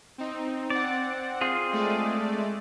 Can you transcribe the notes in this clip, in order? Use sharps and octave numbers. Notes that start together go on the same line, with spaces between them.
C4 D#4
C4 D5 F#5
C4 F4 G#4
G#3 A3 D5